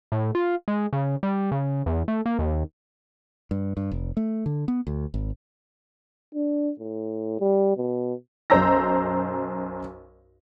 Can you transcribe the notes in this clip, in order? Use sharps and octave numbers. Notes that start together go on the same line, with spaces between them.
A2
F4
G#3
C#3
G3
C#3
E2
A3
A#3
D#2
G2
G2
F1
A3
D3
B3
D2
G#1
D4
A2
G3
B2
B1 F#2 C5 A#5 E6 A#6